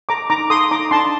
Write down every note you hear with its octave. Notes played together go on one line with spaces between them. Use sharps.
A4 A#5 D6
D#4 A#5 D6
A4 C6 D#6
D#4 A#5 D6
D4 A5 C6